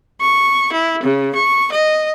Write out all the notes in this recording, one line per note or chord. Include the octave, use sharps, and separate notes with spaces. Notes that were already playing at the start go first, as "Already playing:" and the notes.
C#6
E4
C#3
C#6
D#5